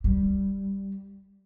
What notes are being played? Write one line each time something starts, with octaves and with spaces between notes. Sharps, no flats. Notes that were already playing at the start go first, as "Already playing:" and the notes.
G3